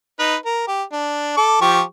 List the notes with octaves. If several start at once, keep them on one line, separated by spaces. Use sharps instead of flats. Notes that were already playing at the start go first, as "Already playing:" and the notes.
D#4 B4
A#4
G4
D4
A4 D6
F3 G4 C#6